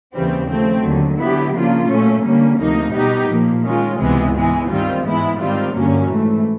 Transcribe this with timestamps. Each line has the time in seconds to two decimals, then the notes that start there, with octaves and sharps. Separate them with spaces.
0.14 D#2 C#3 E3 G3 C4
0.50 C#3 F3 A3 C4
0.83 D#2 D3 F#3
1.19 D3 F#3 B3 E4 G4
1.54 C#3 F3 A#3 D4 F4
1.89 A#2 F#3 A3 C#4
2.24 D3 G3 A#3 C#4
2.59 D2 C3 F3 A#3 D#4
2.94 B2 G3 B3 D#4 G4
3.29 A#2 F3 A#3
3.64 D#3 G#3 C#4 F4
3.99 C#2 C3 E3 G#3 B3
4.34 G#2 E3 G#3 B3
4.69 G2 D#3 G3 C4 F4
5.04 G#2 E3 G#3 B3 E4
5.39 G#2 D#3 G3 C4 F4
5.74 G2 D3 F#3 A#3 C#4
6.09 G#2 E3 A3